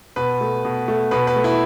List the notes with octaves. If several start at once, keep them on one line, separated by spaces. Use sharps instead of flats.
B2 B4
A3
B2
A3
B2 B4
B4
A3
E4